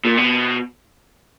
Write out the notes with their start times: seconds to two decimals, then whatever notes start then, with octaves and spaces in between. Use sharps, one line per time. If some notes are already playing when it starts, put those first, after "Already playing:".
0.05 A#2
0.17 B2